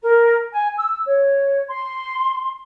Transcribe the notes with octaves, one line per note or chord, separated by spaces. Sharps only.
A#4
G#5
E6
C#5
C6